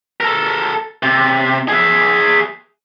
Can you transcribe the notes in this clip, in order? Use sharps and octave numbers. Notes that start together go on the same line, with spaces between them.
A4 A#4
C3
G#4 E5